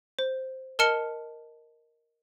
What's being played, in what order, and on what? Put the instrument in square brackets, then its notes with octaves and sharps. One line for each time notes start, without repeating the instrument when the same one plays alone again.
[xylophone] C5
A#4 D#5 A5 F6 C#7 G7